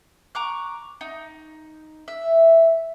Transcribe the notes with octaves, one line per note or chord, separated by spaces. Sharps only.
A#5 C#6 D6 F#6
D#4
E5